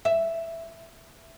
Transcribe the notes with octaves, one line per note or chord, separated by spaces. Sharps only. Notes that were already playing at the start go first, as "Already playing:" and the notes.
E5